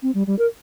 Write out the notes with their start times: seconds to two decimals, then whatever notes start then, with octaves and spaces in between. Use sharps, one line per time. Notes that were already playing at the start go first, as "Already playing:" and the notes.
0.03 C4
0.15 G3
0.27 G3
0.39 A#4